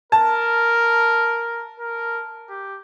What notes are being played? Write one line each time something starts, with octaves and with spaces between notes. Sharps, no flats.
A#4 A5
A#4
G4